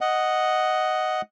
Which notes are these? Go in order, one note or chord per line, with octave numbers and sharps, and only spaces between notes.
D#5 F#5